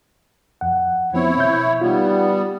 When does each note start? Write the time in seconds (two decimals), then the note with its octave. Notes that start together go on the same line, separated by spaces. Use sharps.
0.61 F2 F#5
1.14 F3 B3 C4 E4 C#5
1.37 B2 E5 G6
1.81 G3 B3 D#4 F4